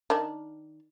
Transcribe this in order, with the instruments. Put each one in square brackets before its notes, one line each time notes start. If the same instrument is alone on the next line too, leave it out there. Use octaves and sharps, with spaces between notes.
[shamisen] D#3 D4